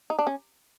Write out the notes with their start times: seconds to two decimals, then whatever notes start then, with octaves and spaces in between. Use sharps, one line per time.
0.10 D#4
0.19 D4
0.27 C#4